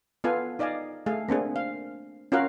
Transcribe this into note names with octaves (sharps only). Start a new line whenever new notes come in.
B3 F4 A4 F5 G#5
D#4 D5 D#5 F5 G#5
A3 G#4 F5
A#3 C4 D4 G#4
F5
C#4 F4 F#4 A#4 F5 F#5